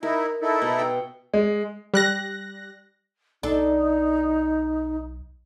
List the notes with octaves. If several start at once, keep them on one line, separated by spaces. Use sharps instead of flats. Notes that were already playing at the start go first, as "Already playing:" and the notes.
D#4 E4 A#4
D#4 E4 A4
B2
G5
G#3
G3 F#6 A#6
B1 D4 D#4 A4